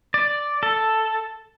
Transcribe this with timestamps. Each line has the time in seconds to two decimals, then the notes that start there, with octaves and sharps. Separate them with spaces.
0.14 D5
0.63 A4